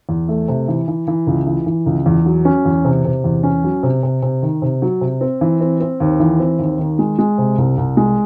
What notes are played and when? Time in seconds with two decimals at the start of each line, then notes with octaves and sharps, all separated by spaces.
0.09 E2
0.29 A3
0.48 C3
0.68 E3
0.88 E3
1.08 E3
1.27 C#2
1.47 E3
1.66 E3
1.86 C#2
2.06 E2
2.26 F#3
2.45 C#4
2.65 E2
2.85 C3
3.05 C3
3.24 E2
3.43 C#4
3.64 F#3
3.83 C3
4.03 C3
4.22 C3
4.42 D#3
4.62 C3
4.82 F#3
5.01 C3
5.21 C4
5.41 E3
5.61 C4
5.80 C4
6.00 D#2
6.20 E3
6.40 C4
6.59 D#2
6.79 D#3
6.99 G#3
7.19 G#3
7.38 C3
7.58 C2
7.77 C2
7.97 G#3